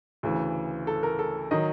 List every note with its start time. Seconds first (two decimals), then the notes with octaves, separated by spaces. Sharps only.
0.23 D2 C#3 E3
0.87 A4
1.03 A#4
1.19 A4
1.51 D#3 F#3 D#5